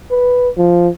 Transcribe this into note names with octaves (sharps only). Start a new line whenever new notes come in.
B4
F3